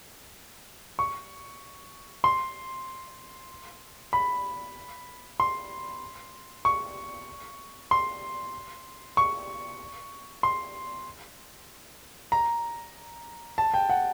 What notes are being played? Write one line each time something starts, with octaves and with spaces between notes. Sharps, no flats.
C#6
C6
B5
C6
C#6
C6
C#6
C6
A#5
A5
G5
F#5